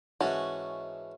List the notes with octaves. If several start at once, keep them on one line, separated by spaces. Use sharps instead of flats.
G#2 E3 C#4 F#4 A5